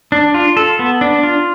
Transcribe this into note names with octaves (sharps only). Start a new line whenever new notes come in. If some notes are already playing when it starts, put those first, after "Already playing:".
D4
F4
A4
B3
D4
F4